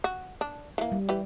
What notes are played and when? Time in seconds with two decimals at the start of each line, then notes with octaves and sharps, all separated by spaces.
0.04 F#4
0.41 D4
0.78 E3 A#3
0.92 G3
1.09 E3 G4 B4